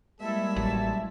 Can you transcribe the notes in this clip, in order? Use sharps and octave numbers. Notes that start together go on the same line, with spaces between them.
G3 G#3 A#3 E4 A4 E5
A1 F#3 A5